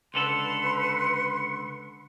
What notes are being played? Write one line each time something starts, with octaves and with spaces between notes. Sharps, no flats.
C#2 D3 A4 B4 C6 C#7